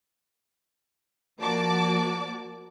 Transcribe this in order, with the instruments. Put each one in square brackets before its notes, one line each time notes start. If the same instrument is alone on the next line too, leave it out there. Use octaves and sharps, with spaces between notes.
[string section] F3 A#3 F#4 D5 A5 D6